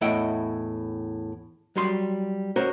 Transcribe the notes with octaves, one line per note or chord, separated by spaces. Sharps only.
E2 A2 E4 D#5 F#5 G5
F#3 G3 C6
C#4 F#4 A#4 C5 C#5